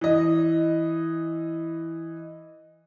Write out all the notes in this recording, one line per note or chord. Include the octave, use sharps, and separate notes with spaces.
E3 D#5